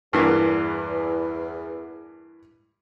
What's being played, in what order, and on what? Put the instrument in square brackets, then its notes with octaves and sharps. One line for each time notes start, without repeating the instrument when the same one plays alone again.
[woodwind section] E2 [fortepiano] G2 E3 A#3